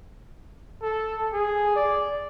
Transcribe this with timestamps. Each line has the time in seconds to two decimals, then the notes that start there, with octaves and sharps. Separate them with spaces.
0.82 A4
1.33 G#4
1.76 D5